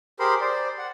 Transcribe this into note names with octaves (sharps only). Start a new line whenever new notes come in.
G4 G#4 A#4 C5 B5 C6
C5 D5
F#5